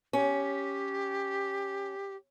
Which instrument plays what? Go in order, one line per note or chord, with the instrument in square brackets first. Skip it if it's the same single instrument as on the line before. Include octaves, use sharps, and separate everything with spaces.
[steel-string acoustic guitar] C#4 [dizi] G4